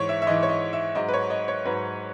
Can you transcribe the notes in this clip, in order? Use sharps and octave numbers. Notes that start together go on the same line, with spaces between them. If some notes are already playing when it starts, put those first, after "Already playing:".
Already playing: G#2 E3 C#5
E5
E5
G#2 E3 D#5
C#5
D#5
E5
G#2 F#3 D#5
B4
C#5
D#5
C#5
G#2 F#3 B4